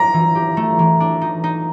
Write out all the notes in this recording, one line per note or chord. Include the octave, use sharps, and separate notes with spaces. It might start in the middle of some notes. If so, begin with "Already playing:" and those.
Already playing: D4 G4 A#5
E3
G4
A3
E3
D4
D#4
D#4